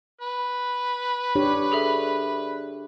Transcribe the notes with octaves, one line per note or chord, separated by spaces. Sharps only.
B4
D4 G4 C#5
G#4 A4 E5